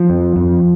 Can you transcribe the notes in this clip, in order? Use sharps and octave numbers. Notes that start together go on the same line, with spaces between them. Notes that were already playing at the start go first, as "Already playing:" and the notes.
Already playing: F3
F2
F2